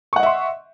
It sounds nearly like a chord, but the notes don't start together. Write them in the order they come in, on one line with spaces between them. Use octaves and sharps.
C#6 F#5 D#5 E5 C6